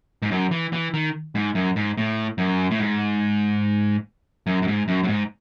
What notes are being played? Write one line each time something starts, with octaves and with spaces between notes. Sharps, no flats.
G#2
F#2
E3
E3
D#3
G#2
F#2
G#2
A2
F#2
A2
G#2
F#2
F#2
G#2
F#2
F#2
G#2